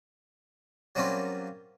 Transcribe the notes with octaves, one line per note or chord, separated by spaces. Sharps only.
F#3 G3 A#3 C4 C#4 F4